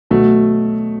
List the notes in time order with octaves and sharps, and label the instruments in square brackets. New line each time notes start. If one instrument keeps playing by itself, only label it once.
[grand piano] B2 F#3 A3